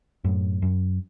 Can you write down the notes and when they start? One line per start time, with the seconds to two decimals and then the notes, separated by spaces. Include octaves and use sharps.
0.24 F#2 A2
0.62 F#2